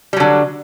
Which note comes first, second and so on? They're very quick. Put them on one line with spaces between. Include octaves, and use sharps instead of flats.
G3 F#3 D3